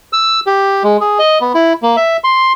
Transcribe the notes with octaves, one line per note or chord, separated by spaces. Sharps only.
E6
G4
G#3
G#4
D#5
B3
E4
A#3
E5
C6